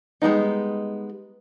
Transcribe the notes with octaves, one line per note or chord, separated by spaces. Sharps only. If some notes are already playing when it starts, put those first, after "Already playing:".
G3 G#3 B3 D#4